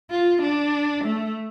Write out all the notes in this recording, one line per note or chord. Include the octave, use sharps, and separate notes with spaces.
F4
D4
A3